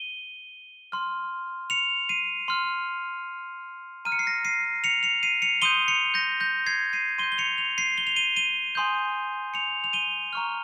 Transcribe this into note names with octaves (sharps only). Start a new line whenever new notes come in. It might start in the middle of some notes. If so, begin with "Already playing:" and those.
Already playing: D#7 G7
C6 F6
C#7 F7
C7 D#7
C6 F6
A#5 F6 D#7
C#7
C7
A#6 C#7
C7 D#7
C#7 F7
C#7 F7
C7 D#7
C#7 F7
C6 D#6 G6 D#7 G7
C#7 F7
G6 A#6
G6 A#6
G#6 C7
C7 D#7
C6 G6 D#7 G7
G7
C#7 F7
C#7 F7
C7 D#7
G7
F7
D#7 G7
D#7 G7
G#5 C6 D#6 G6
C#7 F7
F7
D#7 G7
A#5 C#6 F6